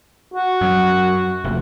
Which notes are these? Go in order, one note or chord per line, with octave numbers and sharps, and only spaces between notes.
F#4
F#2
F1